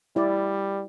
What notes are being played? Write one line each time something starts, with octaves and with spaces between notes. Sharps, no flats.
G3 E4 D5